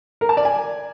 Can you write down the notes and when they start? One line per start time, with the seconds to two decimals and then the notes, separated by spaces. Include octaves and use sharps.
0.21 A#4
0.29 A5
0.37 D5
0.45 G#5